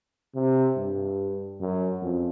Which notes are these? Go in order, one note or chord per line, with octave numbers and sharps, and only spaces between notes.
C3
G2
F#2
F2